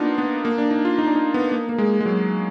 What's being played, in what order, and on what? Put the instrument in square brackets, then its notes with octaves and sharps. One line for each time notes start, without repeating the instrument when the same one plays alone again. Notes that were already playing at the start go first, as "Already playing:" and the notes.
Already playing: [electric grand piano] A#3 B3 D4 D#4 F4
B3
A#3
D4
D#4
F4
D#4
D4
D#4
B3
A#3
A#3
G#3
G#3
F#3